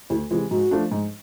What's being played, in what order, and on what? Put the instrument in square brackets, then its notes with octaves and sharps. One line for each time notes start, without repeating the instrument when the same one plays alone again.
[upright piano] D2 [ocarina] E4
[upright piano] C3 E3 G#3 [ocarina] F4
[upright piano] G#2 [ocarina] F#4
[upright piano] F3 A3 D4
G#2